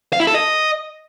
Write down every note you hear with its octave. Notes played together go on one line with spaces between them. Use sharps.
F5
E4
A4
D#5